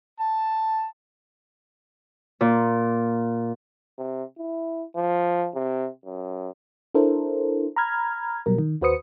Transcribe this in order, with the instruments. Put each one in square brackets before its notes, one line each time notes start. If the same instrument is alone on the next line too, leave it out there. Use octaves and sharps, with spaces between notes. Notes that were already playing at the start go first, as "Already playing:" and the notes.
[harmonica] A5
[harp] A#2
[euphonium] C3
E4
F3
C3
F#2
[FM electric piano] D4 E4 A4 A#4 C5
A#5 B5 F6 G#6
B2 F#3 G3 A#4
D#3
D#2 F#4 B4 C5 D#6 C#7